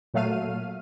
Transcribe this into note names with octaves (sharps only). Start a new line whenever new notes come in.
A#2 F#3 A3 F5 F6 D#7